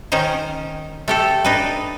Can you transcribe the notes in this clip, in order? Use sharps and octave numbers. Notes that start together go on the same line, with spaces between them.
D#3 C#4 D#4 C5
A3 G4 A4
D4 D#4 B4